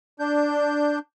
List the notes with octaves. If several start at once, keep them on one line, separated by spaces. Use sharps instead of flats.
D4 G6